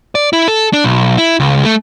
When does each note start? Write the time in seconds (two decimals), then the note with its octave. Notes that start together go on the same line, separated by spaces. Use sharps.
0.15 D5
0.33 E4
0.48 A4
0.73 D4
0.84 B1
1.18 E4
1.40 C#2
1.65 A3